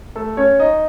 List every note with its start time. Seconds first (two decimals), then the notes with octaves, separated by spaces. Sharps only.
0.16 A3 A4
0.37 C#4 C#5
0.59 D#4 D#5